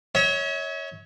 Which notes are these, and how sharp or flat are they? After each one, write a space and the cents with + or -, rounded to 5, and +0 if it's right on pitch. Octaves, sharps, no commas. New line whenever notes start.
C#5 +10 E5 -40